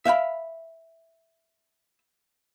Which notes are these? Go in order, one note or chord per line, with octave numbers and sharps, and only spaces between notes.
E5 F5 G5 B5